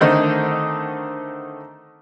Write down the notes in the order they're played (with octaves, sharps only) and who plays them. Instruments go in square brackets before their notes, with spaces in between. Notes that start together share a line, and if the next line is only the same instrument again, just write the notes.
[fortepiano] D3 D#3 A3 C4 D#4